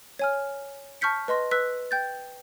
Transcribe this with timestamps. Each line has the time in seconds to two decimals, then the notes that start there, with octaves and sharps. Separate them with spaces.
0.19 C#5 G#5 F6
1.01 A5 C#6 F6 G6 B6 C#7
1.28 B4 D#5 C6 A#6
1.51 B4 E6 F#6 B6
1.91 G5 G6 A6